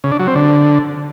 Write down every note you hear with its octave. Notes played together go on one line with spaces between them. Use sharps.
C#3
D4
F#3
C4
D3